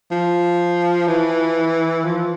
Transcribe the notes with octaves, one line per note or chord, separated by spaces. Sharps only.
F3
E3
F3